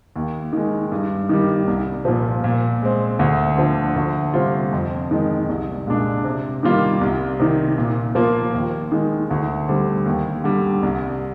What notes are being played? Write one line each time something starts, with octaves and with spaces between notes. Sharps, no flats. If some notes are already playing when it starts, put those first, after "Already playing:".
D#2
D#3 G#3
G2
D#3 G3
C2
A#2 F3
A#2
G#3 C4
D2
D3 F3
D2
C3 G3 C4 F4
F2
D#3 G#3
C2
A#2 G#3 D4
C3
D#3 G3 A#3 F4
C2
C3 D#3
A#2
F3 A#3 F4
D#2
D#3 G#3
D2
D3 G3 C4
D#2
D3 G3
C2